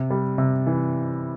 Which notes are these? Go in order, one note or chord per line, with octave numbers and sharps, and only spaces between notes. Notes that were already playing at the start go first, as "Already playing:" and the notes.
Already playing: C3
G3
C3
E3